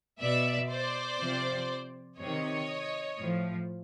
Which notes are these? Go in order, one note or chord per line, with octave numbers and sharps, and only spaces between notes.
B2 D5 E5
C5 D5
C3 F3
C3 D#3 C#5 D#5
A2 F3